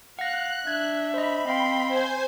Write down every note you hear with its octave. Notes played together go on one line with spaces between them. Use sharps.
F5 F#5 F#6 A#6
D4 E5 G#6
C5 D#5 B5
C4 D#5 F5 G5 C6
C5 G#5 G6